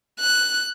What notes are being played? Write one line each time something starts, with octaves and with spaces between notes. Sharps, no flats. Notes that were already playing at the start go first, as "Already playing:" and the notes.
F#6